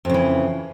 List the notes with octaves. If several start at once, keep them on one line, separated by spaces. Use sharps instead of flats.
F2 C#3 E3